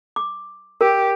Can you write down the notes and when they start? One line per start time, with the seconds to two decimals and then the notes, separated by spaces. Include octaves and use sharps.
0.16 D6
0.81 G4 A#4